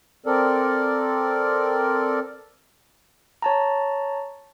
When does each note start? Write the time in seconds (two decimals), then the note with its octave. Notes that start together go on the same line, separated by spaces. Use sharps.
0.26 C4 A4 A#4 D5
3.42 C#5 A5 A#5